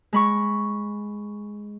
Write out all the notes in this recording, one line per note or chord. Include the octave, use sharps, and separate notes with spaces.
G#3 B5 C#6